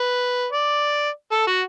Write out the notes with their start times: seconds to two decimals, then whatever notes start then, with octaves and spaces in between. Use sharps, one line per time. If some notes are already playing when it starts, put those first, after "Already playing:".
Already playing: B4
0.52 D5
1.31 A4
1.47 F#4